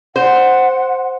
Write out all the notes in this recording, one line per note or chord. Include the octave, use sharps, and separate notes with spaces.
C5 F#5